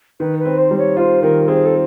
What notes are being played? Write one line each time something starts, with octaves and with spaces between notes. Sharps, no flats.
D#3 B4
B4
C4
C5
G3
C#5
F4 C5
D#3 A#4
C4 G#4
A4